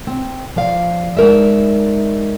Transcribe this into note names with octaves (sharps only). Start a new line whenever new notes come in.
C4
F3 D5 F5
G#3 D#4 A#4 D5 E5